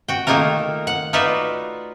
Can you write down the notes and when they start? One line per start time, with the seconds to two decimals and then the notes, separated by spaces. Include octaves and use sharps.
0.08 F#4 G5
0.27 D#3 A3 A#3 D#4 F4 A#4
0.87 F#5
1.13 D#4 F4 F#4 B4 D5 E5